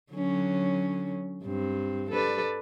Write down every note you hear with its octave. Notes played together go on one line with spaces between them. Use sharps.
D3 F#3 C#4
G2 C4
A4 B4 D5